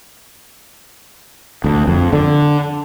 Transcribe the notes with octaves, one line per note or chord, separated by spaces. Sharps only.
D2
F2
D3